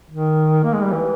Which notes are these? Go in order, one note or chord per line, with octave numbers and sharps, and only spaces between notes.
D#3
A#3
G#3
G3
E3